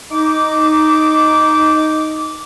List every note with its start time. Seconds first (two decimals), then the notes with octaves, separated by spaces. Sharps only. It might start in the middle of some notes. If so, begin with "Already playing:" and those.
0.12 D#4 D6